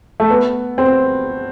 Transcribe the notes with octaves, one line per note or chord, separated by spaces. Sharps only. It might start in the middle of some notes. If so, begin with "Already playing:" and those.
A3
B3
C4